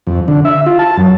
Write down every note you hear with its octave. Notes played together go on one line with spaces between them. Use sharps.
F2
D3
E5
F4
A5
F#2